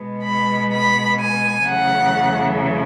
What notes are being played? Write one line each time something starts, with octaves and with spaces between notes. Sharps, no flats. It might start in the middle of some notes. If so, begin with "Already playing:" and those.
Already playing: B2 G#3 B3
B5
B5
G#5
E2 C#3 F#3 A3 F#5